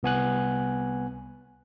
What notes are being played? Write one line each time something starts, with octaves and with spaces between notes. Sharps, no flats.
C2 B3 G#5 F#6